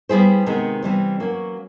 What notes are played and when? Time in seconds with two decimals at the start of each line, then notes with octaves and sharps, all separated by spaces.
0.09 G3 B3 E4 G#4 C5
0.46 C3 D#3 G#3 B3
0.82 C3 E3 G3 C4
1.20 F#3 A#3 C#4 F#4